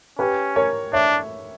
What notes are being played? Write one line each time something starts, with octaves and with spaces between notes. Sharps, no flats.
C#4 G4 B4
A#4 C#5
D4 C#5 E5